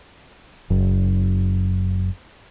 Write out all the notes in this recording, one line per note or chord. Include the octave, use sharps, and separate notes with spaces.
F#1 F#2